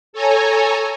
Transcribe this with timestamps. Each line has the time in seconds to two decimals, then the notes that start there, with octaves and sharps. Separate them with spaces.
0.13 A4 C#5 G#5 A#5